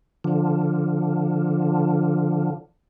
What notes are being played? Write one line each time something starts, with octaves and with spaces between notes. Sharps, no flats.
D3 F3